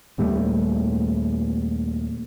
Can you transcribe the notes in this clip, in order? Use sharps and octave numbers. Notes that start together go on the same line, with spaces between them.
D#2 A#2 G3 A3